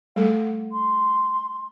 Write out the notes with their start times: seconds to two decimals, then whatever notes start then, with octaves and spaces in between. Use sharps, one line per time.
0.16 G3 A3 A4 F#5
0.71 C6